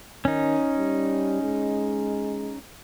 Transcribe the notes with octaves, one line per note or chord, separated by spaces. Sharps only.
D#3 C#4 D#4
G3
G#3